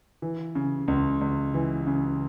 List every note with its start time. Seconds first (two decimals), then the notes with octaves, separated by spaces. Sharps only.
0.22 E3
0.55 C#3
0.88 C#2
1.21 C#2
1.54 E3
1.87 C#3